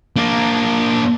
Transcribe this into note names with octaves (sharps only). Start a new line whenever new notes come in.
A#3 D4